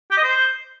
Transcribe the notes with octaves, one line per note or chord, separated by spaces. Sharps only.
G4
D#5
C5